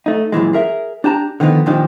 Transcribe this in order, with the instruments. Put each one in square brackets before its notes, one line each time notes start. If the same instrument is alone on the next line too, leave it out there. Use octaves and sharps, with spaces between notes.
[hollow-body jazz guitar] A3 D#4
F#2 A#2 E3 G#3
G#4 A#4 E5
D4 G4 A5 A#5
D3 D#3 F3 B3 D#4
A#2 D#3 F3 D4 D#4 G4